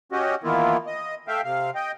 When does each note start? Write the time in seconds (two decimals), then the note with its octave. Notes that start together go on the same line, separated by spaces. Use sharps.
0.12 C#4 F#4 G4 D#5
0.44 D#3 E3 A#3 B3 E4 F4
0.87 D#5
1.28 A3 E5 F5 G5
1.44 C3 F5
1.75 D#5 G5